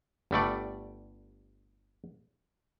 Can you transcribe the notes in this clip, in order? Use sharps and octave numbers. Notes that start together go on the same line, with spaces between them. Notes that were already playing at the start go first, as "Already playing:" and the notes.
G1 G3 A3 D5